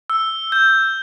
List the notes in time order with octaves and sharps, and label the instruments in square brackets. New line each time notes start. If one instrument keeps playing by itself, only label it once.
[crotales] E6
G6